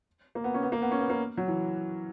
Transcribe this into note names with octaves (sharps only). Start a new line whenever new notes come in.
A#3
B3
C#4
B3
A#3
B3
C#4
B3
A#3
F#3
E3